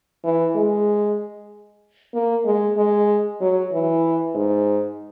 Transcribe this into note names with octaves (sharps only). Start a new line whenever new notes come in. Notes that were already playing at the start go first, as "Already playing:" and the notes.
E3
G#3
A#3
G#3
G#3
F#3
E3
G#2